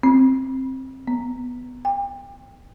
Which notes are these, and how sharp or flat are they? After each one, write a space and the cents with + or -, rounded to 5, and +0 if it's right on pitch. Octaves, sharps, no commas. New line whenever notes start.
C4 +15
B3 +10
G5 +35